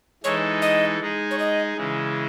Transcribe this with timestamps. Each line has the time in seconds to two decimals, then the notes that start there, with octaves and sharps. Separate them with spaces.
0.23 E3 G#3 D#4 A4 C#5
0.62 D#5
1.01 G#3 D#4 G#4
1.31 C#5
1.39 D#5
1.77 C#3 E3 G#3